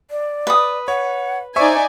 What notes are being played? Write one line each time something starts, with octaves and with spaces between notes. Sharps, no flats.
D5
B4 D#6
C#5 F#5
D#4 C5 D5 E5 G#5 C#6